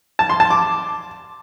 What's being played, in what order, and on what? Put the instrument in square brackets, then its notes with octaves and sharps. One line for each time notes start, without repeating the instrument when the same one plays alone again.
[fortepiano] A5
C6
A5
D6